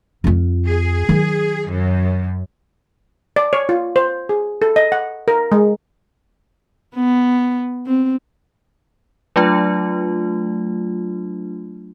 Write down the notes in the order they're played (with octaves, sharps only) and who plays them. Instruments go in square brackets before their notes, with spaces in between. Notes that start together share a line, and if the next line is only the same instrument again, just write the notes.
[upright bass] F2 F4
[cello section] G#4
[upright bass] D#3 F#3
[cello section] F#2
[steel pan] D5
C#5
F4
C5
G#4
A4
D#5
F#5
A#4
G#3
[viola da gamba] B3
C4
[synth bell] F#3 A3 D4 F4